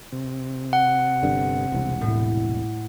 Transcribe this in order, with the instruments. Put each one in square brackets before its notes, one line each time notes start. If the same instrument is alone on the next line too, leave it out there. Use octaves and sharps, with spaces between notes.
[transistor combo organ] C3
[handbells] F#5
[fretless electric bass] G1 G2 D3
E1 C2
[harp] A2